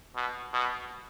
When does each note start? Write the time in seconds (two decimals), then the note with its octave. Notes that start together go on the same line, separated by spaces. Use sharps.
0.15 B2
0.53 B2